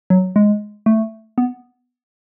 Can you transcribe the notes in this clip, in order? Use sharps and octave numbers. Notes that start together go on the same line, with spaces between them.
F#3
G#3
A3
B3